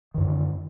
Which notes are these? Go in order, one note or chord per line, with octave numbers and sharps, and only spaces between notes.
F#2 D3 D#3